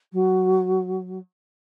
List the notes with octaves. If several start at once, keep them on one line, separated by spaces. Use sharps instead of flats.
F#3